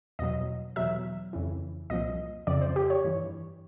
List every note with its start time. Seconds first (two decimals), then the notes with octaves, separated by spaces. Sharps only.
0.19 E2 B2 F#3 D#5
0.76 E2 B2 F#3 E5
1.33 F2 C#3 E3
1.90 C2 A#2 F3 D#5
2.47 F2 C#3 F3 D5
2.61 C5
2.76 G4
2.90 C#5
3.04 G2 E3